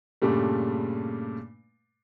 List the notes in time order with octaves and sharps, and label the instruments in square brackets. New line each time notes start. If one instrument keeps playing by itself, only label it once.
[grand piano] G2 A#2 C#3 G3 A3